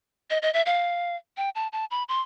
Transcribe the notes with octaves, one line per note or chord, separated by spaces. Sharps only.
D#5
D#5
E5
F5
G5
A5
A5
B5
C6